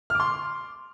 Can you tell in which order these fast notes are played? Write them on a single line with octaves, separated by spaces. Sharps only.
F6 D6 C6